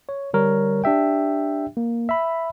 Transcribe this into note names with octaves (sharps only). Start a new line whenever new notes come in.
C#5
D3 G3 A#4 C#5
D4 G4 E5 G5
A#3
E5 B5